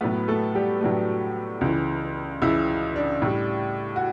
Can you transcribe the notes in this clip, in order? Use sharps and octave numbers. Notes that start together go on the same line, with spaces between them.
A2 F#3 A3 B3 B4
A3 A4
G3 G4
A2 F#3 A3 D4
C#2 C#3 E3
C#2 C#3 E3 E4
D4
A2 G3
F#4